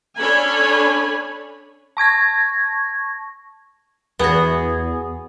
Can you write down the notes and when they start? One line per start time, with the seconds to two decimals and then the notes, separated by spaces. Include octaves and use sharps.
0.18 C#4 D4 A4 C#5 G#5 B5
1.97 A5 C#6 G#6 A#6
4.19 E2 B3 F#4 G#4